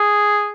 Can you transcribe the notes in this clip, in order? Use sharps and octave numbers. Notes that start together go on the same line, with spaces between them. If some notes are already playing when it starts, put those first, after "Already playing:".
Already playing: G#4